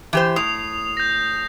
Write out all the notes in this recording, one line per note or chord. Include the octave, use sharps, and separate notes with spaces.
E3 G4 C5
A2 D#6 C7 F7
G6 A#6